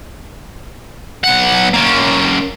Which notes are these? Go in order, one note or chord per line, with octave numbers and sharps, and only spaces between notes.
B1 F#5
A#3 C#4